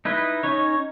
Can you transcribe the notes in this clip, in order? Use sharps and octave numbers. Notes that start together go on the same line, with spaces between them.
D#4 E4 B4 D#5
C#4 D#4 C#5